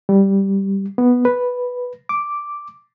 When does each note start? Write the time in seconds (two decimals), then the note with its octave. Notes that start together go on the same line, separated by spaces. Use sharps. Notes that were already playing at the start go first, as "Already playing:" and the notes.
0.09 G3
0.98 B3
1.25 B4
2.09 D6